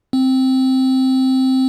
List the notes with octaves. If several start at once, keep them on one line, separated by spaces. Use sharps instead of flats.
C4